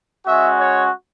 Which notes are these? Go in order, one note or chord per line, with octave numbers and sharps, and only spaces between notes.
G#3 C#4 F#4 E5
C#5